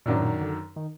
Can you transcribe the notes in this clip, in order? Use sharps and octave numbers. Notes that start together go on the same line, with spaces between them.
F#2 A#2 D#3 F#3 D4
G#2
A#2
D3
D#3